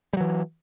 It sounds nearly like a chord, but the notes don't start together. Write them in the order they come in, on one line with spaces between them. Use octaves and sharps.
G3 F#3 E3